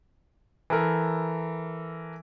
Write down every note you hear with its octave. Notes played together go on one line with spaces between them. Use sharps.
E3 A4 A#4